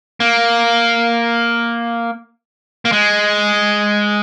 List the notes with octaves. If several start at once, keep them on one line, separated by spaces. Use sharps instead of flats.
A#3
A#3
G#3